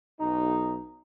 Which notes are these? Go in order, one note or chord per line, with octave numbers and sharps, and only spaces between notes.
B1 D#4